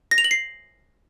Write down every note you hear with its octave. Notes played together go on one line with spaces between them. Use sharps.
A#6
F7
F#7
C7